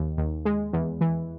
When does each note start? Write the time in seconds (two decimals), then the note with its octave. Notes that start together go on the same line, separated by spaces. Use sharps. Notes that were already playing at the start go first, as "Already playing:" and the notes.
Already playing: D#2 D#3
0.18 D#2
0.45 G#3
0.73 E2
1.01 E3